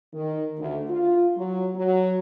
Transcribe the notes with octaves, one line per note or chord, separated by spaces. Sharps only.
D#3
D2
F4
F#3
F#3